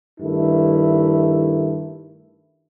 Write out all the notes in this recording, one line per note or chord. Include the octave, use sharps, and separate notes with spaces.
G2 D#3 A3 E4